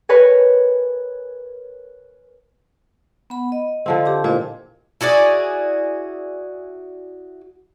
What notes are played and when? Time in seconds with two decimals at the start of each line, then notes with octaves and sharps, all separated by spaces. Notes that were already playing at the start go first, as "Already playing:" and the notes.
0.09 A#4 B4 C#5 G#5
3.30 B3 F#5 B5
3.52 D#5
3.86 D3 F3 C4
4.06 G4 A5 D6
4.24 A#2 E4 C5 D#5
5.01 E4 F#4 G#4 D5